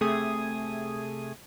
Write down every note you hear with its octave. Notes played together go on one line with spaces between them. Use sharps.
C3 A3 G#4 D#6 G#6